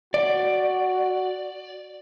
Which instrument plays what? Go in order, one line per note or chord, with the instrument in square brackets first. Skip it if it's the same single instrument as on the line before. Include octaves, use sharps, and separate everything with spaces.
[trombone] F#4 [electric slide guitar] D5